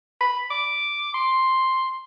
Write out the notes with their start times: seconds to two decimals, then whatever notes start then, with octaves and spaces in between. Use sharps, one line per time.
0.21 B5
0.50 D6
1.14 C6